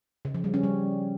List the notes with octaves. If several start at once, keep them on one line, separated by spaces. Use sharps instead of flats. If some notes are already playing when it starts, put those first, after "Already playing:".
C#3
F3
G3
C#4
G3